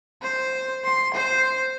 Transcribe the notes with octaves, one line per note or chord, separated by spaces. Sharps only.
C5
C6
C5